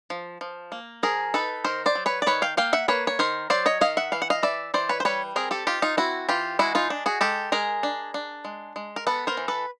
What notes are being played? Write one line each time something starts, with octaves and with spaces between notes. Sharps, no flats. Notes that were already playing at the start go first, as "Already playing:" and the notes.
F3
F3
A#3
F3 G#4 A#4
D#4 A4 B4
D#3 A#4 C5
C5 D5
F#3
B4 C#5
D5
D#3 B4 C#5
F5 G5
A#3 F5 G5
E5 F#5
A#3 B4 C#5
C#5
D#3 A#4 C5
F#3 C5 D5
C#5 D#5
D#3 D#5 F5
E5 F#5
E3 F5
F#5
D#5 F5
E3 D5 E5
E3 C5 D5
B4 C#5
C5
G3 B4 C#5
C4 G#4 A#4
G4 A4
D#4 F4 G4
D#4 F4
C4 E4 F#4
E3 F4 G4
G#3 E4 F#4
D#4 F4
D4
F#4 G#4
G#3 G4 A4
G#3 G#4 A#4
D4
D4
G#3
G#3
A#4
B3 A4 B4
A#4 C5
E3
A4 B4